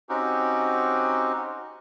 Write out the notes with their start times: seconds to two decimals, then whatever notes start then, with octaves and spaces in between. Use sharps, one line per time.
0.09 C4 C#4 D#4 F#4 G4